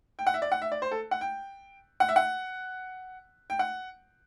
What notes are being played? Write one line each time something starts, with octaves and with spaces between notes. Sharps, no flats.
G5
F#5
E5
D5
F#5
E5
D5
C5
A4
F#5
G5
F#5
E5
F#5
G5
F#5